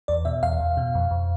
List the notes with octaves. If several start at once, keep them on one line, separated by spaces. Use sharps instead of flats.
E2 D5
B2 E5
E2 F5
E2
B2
F2
F2